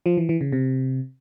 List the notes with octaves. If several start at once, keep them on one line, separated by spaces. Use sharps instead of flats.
F3
E3
E3
C#3
C3